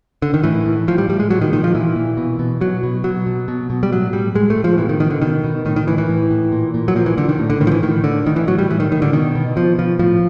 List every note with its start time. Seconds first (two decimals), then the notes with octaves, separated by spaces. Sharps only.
0.22 D3
0.34 D#3
0.43 A2 E3
0.66 A2
0.87 A2 F3
0.98 G3
1.09 A2 G3
1.20 G#3
1.30 A#2 F#3
1.41 D#3
1.52 A#2 D#3
1.64 F3
1.75 A#2 E3
1.96 A#2
2.17 B2
2.39 B2
2.61 B2 F#3
2.83 B2
3.04 B2 F#3
3.27 B2
3.48 B2
3.70 B2
3.83 G3
3.92 A2 F#3
4.13 A2 G3
4.35 A2 G#3
4.50 A3
4.56 A2
4.64 F3
4.78 B2 E3
4.89 D#3
5.00 B2 D#3
5.10 D3
5.22 B2 D#3
5.44 B2
5.65 A2 D#3
5.76 D#3
5.87 A2 E3
5.98 E3
6.09 A2
6.31 A2
6.52 A#2
6.74 A#2
6.88 F#3
6.95 A#2 F3
7.06 E3
7.17 A#2 D3
7.29 D#3
7.39 A2
7.50 D3
7.60 A2 D#3
7.67 F3
7.72 E3
7.83 A2 D#3
8.04 A2 D3
8.26 A2 D#3
8.36 E3
8.47 A2 F#3
8.58 G3
8.70 A2 E3
8.80 D#3
8.91 A2 D#3
9.02 D3
9.12 B2 D#3
9.35 B2
9.56 B2 F3
9.78 B2 F3
9.99 A2 F3